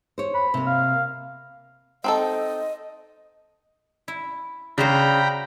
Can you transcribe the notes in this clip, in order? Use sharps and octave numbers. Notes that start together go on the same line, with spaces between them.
C5 C#5
B5
C3 A#3
F5
C4 D#4 A4 D#5
E4
C#3 D4 F#4 C5 G5 A#5 B5